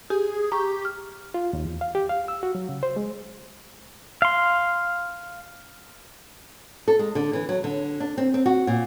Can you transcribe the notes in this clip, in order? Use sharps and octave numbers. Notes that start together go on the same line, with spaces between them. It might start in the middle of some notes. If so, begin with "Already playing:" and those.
G4 G#4
G4 A#5 C#6
F6
F4
D#2
E2
F5
G4
F5
E6
F#4
F#3
C#3
C5
G#3
F5 C6
A4
G#3
D3
E3
F#3
D3
D4
C4
C4
F#4
A#2